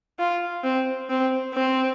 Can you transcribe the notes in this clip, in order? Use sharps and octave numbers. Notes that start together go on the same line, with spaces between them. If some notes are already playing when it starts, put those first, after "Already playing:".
F4
C4
C4
C4